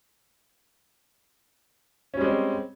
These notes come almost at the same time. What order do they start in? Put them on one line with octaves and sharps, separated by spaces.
C#4 G3 G#3 C4